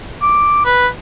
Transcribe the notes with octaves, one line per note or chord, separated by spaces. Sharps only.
D6
B4